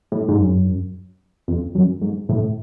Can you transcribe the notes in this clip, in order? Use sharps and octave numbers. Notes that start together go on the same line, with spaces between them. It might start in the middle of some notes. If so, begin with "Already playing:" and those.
A2
G#2
F#2
F2
F#2
G#2
A2